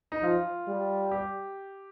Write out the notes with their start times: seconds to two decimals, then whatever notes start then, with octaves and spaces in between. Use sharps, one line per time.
0.12 D#4
0.22 F3 F4
0.68 G3
1.11 G4